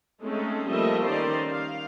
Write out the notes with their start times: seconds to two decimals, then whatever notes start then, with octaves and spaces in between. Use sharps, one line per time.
0.22 G#3 A3 C4 C#4 D#4 A4
0.69 F3 G3 A3 A#3 D#5 E5
1.05 D#3 C#4 D#4 C5 D5
1.50 F5